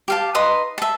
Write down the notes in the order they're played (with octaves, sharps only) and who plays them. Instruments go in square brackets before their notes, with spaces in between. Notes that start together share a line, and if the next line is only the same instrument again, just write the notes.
[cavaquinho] G4 F5 A5
D#4 B4 C6 D#6
E5 A5